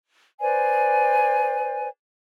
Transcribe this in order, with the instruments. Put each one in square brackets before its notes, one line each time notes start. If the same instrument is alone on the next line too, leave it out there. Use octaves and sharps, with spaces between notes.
[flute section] B4 C5 D5 G#5